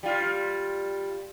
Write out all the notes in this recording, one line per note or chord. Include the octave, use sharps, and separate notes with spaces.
G3 F4